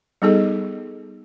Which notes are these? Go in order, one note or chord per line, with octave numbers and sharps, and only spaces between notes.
G3 B3 D#4 G#4 A4 D#5